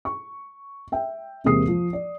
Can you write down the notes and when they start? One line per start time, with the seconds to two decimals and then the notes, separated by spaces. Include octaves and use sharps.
0.05 C#6
0.92 E5 G5
1.44 E1 C3 A#3 G#4 D#6 C7
1.68 F3
1.93 D5